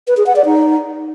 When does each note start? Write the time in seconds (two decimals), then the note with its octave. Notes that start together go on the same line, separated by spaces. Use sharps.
0.08 B4
0.17 G#4
0.26 F#5
0.36 D5
0.45 D#4